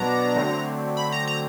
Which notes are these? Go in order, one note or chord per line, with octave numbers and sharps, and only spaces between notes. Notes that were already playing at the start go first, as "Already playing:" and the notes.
Already playing: B2 F#3 B3 D4 A#5
D3 F#3 A3 C4
B5
A#5
A#5